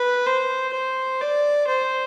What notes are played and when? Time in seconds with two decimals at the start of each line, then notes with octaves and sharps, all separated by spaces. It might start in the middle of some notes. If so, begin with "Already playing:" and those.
Already playing: B4
0.27 C5
0.73 C5
1.21 D5
1.67 C5